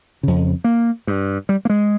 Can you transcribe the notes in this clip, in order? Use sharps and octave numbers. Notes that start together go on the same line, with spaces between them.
F2 C#3
A#3
G2
G3
A#3
G#3